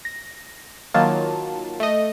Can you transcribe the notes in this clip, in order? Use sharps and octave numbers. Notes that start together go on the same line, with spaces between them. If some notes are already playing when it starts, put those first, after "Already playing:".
A#6
D#3 F#3 A#3 F4 A5
A3 D#5